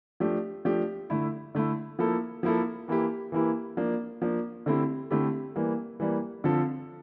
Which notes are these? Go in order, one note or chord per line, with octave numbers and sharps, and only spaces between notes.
F3 A3 D4 G4
F3 A3 D4 G4
D3 A3 E4
D3 A3 E4
F3 A#3 E4 A4
F3 A#3 E4 A4
E3 A#3 E4 G4
E3 A#3 E4 G4
F3 A#3 D4
F3 A#3 D4
D3 A3 C4 E4 G4
D3 A3 C4 E4 G4
E3 G3 A#3
E3 G3 A#3
D3 F3 C4 F4 A4